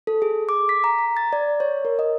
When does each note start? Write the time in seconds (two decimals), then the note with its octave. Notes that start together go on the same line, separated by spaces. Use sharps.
0.07 A4
0.22 G#4
0.49 D6
0.69 B6
0.84 A#5
0.99 A#5
1.17 A6
1.33 D5
1.60 C#5
1.85 A#4
1.99 D#5